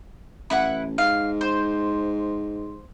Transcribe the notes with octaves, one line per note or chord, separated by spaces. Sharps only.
A1 E4 B4 F#5
G#2 F5
C5